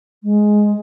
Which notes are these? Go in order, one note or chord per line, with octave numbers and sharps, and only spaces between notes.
G#3